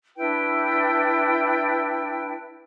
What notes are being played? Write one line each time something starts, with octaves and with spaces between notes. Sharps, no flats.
D4 E4 B4 G5